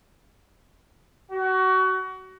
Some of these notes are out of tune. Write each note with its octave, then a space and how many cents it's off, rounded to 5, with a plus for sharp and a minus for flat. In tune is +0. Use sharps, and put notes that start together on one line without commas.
F#4 +25